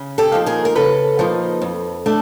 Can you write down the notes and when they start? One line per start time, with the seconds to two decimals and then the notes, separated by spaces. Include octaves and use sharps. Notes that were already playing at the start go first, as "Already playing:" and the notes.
Already playing: C#3
0.18 G4 A4
0.32 F3 A#3 D#4
0.46 G#4 A#4
0.65 A#4
0.75 C#3 A4 B4
1.19 F3 A#3 D#4
1.61 F2
2.06 A3 D4